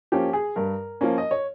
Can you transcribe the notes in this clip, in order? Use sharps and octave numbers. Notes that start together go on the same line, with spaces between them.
F3 A#3 C#4 G4
G#4
G2 A#4
F3 A#3 C#4
D#5
C#5